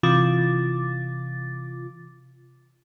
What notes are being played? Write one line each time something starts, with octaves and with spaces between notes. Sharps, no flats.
C3 E3 F4 D6 A6